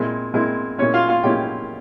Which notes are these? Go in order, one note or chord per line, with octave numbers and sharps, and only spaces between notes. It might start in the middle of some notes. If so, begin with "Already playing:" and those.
Already playing: A#2 G#3 C4 E4
A#2 G#3 C4 E4
A#2 G#3 C#4 E4 C#5
F4 F5
F4 F5
A#2 G#3 C#4 E4 G4 G5